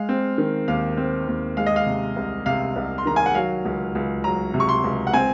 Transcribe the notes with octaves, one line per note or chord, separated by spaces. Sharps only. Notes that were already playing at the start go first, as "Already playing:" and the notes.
Already playing: G#3 F5
C4
D#3
D#2 F5
C4
D#2
G#3 F5
D#5
F5
C3
C2
C3 F5
C2
C6
D#3 A#5
G#5
F#5
F#3 F5
C#2
C#2
F#3 A#5
C3
C#6
C6
C#2
F#5
C4 G#5